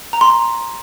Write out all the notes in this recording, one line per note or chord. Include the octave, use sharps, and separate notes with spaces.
A#5
C6
A#5